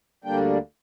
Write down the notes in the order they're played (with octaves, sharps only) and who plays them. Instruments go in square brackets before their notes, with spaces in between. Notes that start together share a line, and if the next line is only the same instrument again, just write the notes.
[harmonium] D2 D3 G3 A#3 D4 G5